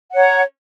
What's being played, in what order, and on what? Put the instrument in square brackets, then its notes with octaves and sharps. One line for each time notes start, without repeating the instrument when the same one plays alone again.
[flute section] F#5
C#5
A#5